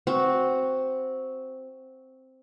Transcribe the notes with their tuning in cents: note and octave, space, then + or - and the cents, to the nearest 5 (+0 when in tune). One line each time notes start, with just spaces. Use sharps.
C4 +0 F#4 +0